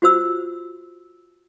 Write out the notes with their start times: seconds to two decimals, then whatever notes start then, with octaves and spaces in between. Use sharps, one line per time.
0.02 F4 F#4 C5 E6